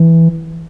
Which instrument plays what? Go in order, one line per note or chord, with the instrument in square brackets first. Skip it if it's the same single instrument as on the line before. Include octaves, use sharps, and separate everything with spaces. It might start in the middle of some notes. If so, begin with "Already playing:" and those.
Already playing: [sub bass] E3